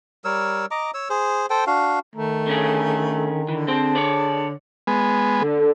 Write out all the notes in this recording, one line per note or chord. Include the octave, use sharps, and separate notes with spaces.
G3 A#4 C#5 E6
D#5 A#5 D6
C#5 E6
G#4 C5
A4 C5 G5
D4 F#4 F5
D#3 A3 A#5
D3 C#4 G#4
D3 E3
C4 G#4 C5 A5
C#5 D5
G#3 B3
D3